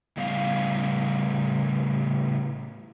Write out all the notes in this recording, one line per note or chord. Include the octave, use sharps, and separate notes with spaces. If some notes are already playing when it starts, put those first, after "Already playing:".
A2 C#3 G3 B3 E4 F5